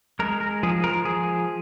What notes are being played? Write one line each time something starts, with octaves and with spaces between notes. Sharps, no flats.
G#3 A#4
A#4
F3 G#4
A#4
F3 G#4